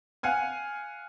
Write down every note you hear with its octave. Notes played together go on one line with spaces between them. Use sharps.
F5 F#5 G#5 F6